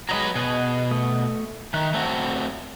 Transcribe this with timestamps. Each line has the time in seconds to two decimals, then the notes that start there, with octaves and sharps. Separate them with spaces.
0.09 F#3 G#3 B4 D#5 A#5
0.35 B2 G#4 D#5 F#5
0.91 A3 D#6
1.74 D#3 E5 A#5 F#6
1.94 A3 C4 F#4